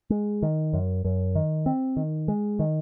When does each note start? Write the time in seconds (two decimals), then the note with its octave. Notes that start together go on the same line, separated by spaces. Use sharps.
0.10 G#3
0.42 D#3
0.73 F#2
1.05 F#2
1.35 D#3
1.66 C4
1.97 D#3
2.28 G#3
2.59 D#3